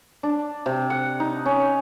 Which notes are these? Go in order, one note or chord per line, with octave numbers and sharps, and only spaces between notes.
D4
C3
F#5
D#4
C#4